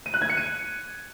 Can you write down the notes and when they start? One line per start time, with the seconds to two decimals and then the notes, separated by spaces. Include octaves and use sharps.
0.06 D#7
0.14 F#6
0.22 G#6
0.30 C#7
0.37 D#7